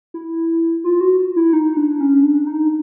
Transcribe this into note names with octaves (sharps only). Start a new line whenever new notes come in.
E4
F4
F#4
E4
D#4
D4
C#4
D4
D#4